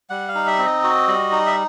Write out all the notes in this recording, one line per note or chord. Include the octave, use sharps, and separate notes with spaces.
G3 F#5
F5
D#4
E5
C4
D#5
F#4
G3
D#4
E5